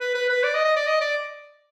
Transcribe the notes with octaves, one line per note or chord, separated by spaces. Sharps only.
B4
B4
B4
D5
D#5
D#5
D5
D#5
D5